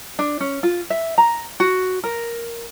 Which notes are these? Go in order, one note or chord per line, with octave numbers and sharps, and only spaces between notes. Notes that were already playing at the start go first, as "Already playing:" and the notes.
D4
C#4
F4
E5
A#5
F#4
A#4